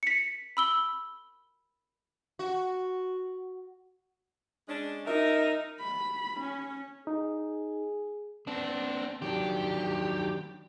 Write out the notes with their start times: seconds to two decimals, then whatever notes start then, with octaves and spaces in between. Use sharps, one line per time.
0.03 B6 C#7
0.57 B5 E6 G7
2.39 F#4
4.68 G#3 C#4 D4
5.06 D#4 A#4 E5
5.80 B5
6.40 C#4
7.07 D#4 G#4
8.47 B3 C4 D4
9.22 D#3 F#3 D4 G4